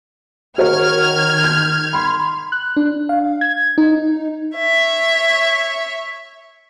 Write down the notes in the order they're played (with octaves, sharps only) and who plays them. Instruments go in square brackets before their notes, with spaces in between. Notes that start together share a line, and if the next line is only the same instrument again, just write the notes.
[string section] D#3 F6 G#6 [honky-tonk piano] F#4 A#4 C#5
[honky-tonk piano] G6
B5 C6
[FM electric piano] F#6
D4
F5
G#6
D#4
[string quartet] C#5 E5